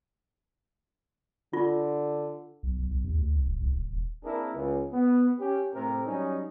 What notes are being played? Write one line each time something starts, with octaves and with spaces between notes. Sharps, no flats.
D3 F4
B1
B1
B1
D#2
D2
C2
D1
C2
D1
E1
A#3 C4 D4 E4 G#4 A#4
C#2
B3
C#4 G4
A2 C3 A#4
F#3 G3 C#4 D#4